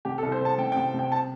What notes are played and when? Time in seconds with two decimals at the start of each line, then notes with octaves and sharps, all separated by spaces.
0.05 C3 G4
0.18 A4
0.23 C2
0.32 C5
0.40 C2 A5
0.58 C3 G5
0.72 G5
0.77 C3
0.94 C3 G5
1.12 A5